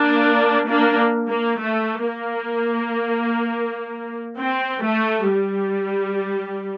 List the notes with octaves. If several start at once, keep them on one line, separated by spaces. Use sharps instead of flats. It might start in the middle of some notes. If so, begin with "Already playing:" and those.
Already playing: A#3 D4
A#3 D4
A#3
A3
A#3
C4
A3
G3